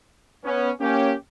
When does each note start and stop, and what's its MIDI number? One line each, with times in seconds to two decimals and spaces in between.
0.44 0.70 59
0.44 0.70 61
0.81 1.14 58
0.81 1.14 61
0.81 1.14 67